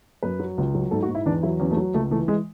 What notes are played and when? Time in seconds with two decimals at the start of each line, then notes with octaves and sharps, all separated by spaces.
0.23 F#2 B4
0.40 F#3
0.58 C#2
0.75 F#3
0.91 G#2 A4
1.02 F#4
1.08 G#2
1.15 E4
1.26 E2 D4
1.43 F#3 E4
1.60 E2 C#4
1.71 A3
1.77 F#3
1.94 C#2 A3
2.11 E3 A3
2.28 G#3